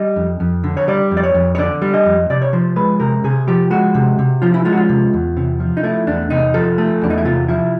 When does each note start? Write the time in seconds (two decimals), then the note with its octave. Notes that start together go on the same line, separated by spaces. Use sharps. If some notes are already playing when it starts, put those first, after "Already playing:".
Already playing: G3 D#5
0.16 F2
0.40 F2
0.64 D3
0.77 C#5
0.88 G3 D5
1.11 F2
1.17 D5
1.23 C#5
1.34 F2
1.55 C#5
1.58 D3 D5
1.82 G3
1.94 D#5
2.05 F2
2.30 C3 D5
2.42 C#5
2.53 F3 C5
2.76 G#3 B4
3.00 C3 A#4
3.24 C3 G#4
3.48 F3 G4
3.71 G#3 F#4
3.95 C3
4.19 C3
4.42 F3 F4
4.54 E4
4.65 G#3 F4
4.72 F#4
4.77 F4
4.89 C3
5.13 E2
5.37 C3
5.60 F3
5.77 D#4
5.83 A3 E4
6.07 E2 D4
6.30 C3 D#4
6.54 F3 A4
6.78 A3
7.01 E2 D4
7.10 D#4
7.18 E4
7.25 C3 F4
7.48 F3 E4